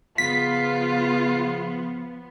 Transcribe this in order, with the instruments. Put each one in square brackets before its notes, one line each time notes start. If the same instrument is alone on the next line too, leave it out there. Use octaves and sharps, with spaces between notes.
[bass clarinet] C#3 [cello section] F3 B3 [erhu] F4 [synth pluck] B6